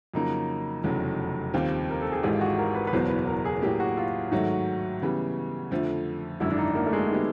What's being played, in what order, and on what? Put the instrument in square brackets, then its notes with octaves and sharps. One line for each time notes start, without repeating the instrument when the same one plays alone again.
[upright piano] F2 C#3 F#3 A#3 [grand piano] D#4
[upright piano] F1 E2 C#3 F#3
D#2 D#3 G3 C4 F4
[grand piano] A#4
A4
G#4
[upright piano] G#1 G#2 E3 G#3 [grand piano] G4
[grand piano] F4
F#4
A#4
B4
B4
[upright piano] F#1 E2 B2 F#3 B3 [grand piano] C5
[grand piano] B4
A#4
G#4
[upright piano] A2 F#3 A#3 [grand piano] G4
[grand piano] F#4
F4
[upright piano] G#2 D#3 F#3 A3 [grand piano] F#4
[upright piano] C#3 E3 G3 B3
F2 D3 F3 A3
[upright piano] G#1 F#2 D3 [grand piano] E4
[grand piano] D4
D#4
A#3
A3
G#3
[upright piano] D#3 G3 B3